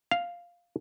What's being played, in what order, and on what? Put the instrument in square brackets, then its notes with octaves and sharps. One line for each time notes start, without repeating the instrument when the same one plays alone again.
[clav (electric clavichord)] F5